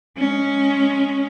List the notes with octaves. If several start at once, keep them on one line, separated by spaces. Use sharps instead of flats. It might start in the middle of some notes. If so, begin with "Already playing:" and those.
G#3 C#4